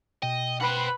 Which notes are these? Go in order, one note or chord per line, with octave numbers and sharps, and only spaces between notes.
B2 D#5 G5
B4 C5 F#5 B5